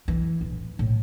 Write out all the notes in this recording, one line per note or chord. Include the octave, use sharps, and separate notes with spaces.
E3
D1
A2